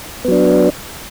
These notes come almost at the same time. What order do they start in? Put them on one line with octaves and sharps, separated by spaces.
B3 F#3 D4